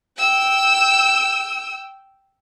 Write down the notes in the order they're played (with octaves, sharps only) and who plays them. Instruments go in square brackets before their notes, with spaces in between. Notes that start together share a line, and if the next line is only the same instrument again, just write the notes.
[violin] G5 E6